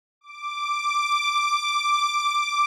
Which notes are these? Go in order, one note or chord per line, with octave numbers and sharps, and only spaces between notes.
D6
D6